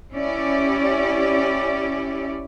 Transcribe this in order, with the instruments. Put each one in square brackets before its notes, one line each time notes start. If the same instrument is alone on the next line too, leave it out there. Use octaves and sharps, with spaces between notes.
[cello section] C#4 E4 G4 D5